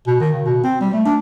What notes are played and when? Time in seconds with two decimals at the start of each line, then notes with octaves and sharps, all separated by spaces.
0.07 B2
0.20 D#3
0.32 C#3
0.46 B2
0.63 C4
0.80 G3
0.93 A3
1.05 D4